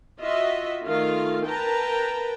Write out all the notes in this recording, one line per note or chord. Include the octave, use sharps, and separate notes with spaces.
F4 F#4 D#5 E5
D#3 A3 F4 F5
A#4 B4 G5 A5 A#5